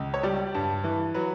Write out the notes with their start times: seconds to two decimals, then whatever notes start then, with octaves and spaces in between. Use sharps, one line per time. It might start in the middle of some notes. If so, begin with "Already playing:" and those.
Already playing: C#2
0.14 C#5
0.23 G3 D5
0.54 G2
0.84 E3
1.14 F#3 B4